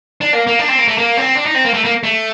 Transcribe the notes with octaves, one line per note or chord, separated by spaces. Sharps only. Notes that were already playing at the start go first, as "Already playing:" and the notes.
D4
A#3
A#3
D4
C4
A#3
A3
A#3
C4
D4
D#4
C4
A#3
A3
A#3
A3